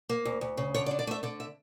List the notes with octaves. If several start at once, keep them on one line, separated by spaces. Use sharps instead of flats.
A#3
D2
D2
C#3
D3 C#5
D5
D4
D5
A3 E5
D3 D5
E5